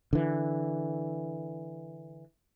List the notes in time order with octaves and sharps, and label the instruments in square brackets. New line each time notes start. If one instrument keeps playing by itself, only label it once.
[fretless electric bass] D3 E3